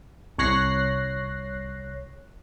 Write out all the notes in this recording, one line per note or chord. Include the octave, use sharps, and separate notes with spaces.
C2 C#5 F#6 A#6 C7